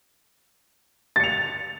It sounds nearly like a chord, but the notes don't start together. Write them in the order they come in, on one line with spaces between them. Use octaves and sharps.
A6 C#7 F7